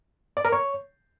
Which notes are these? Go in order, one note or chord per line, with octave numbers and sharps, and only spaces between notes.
D5
A#4
C#5